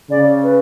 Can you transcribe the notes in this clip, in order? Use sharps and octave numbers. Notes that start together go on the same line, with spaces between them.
C#3 D5
B4